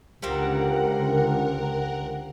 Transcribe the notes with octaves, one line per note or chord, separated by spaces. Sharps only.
C#2 D3 G3 A#3 C4 A#4 F#5